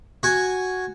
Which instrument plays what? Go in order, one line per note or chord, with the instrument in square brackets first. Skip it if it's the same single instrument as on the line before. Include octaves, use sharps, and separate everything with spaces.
[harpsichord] F#4 G#5